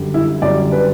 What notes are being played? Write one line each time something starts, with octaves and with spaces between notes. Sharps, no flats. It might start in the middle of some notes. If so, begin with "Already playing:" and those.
Already playing: F#2 D3 G3
E4
F#2 D3 G3 D5
B4